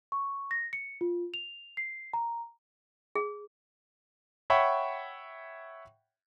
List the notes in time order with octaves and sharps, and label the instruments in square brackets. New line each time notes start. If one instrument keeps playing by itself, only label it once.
[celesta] C#6
A#6
C#7
F4
F7
C7
A#5
[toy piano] G#4
[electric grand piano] C#5 E5 F#5 G5 B5 C#6